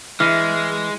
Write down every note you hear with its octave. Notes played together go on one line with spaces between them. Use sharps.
E3 G#3 F6